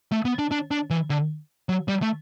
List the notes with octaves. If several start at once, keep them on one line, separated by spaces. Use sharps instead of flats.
A3
B3
D4
D4
D4
E3
D3
F#3
G3
A3